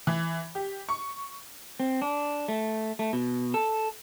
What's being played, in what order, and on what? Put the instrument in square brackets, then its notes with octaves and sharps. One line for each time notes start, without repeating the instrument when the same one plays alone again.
[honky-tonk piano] E3
G4
C#6
[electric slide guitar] C4
D4
A3
A3
B2
A4